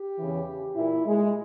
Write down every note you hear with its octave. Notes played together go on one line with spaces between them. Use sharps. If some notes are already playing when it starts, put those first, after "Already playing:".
Already playing: G4
E2 C#3 E3
A#2 E4
G#3